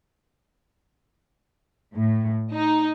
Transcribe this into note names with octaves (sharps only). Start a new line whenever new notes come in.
A2
D#4